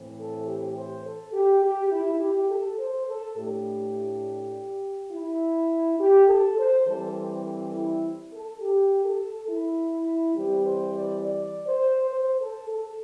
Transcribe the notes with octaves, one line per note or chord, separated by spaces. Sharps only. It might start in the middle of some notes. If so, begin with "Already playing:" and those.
Already playing: A2 E3 C4
A4
G4
C5
A4
G4
G4
E4
G4
A4
C5
A4
A2 A3 D4 G4
E4
G4
A4
C5
E3 G3 C4 A4
C5
A4
E4
A4
G4
A4
E4
E3 G3 C4 G4
C5
D5
D5
C5
C5
A4
A4